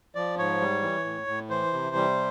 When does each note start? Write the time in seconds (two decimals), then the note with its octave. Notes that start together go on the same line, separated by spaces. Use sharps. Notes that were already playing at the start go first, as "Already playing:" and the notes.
0.15 F3 D5
0.38 G#2 C#5
0.61 G3
0.82 E3
1.05 A2
1.27 A2
1.50 E3 C5
1.73 C3
1.96 G3